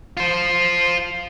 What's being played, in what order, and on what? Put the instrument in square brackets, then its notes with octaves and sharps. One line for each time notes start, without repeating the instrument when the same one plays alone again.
[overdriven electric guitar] F4 C5